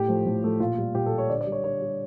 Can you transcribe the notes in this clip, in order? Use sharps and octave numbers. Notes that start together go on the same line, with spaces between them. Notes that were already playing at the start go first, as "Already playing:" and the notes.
Already playing: A2 G4
F3 A3
A2
F3 A3
A#2 F4
G3
A#2 G4
A4
G3
C#5
D3 D5
D5
G3
C#5
D3 C#5
G3